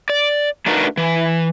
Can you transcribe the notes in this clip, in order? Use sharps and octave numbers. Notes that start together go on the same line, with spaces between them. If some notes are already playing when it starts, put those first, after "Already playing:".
D5
A3 D4 D#4 F#4 A#4 B4
E3